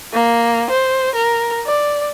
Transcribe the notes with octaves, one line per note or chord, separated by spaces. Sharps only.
A#3
C5
A#4
D5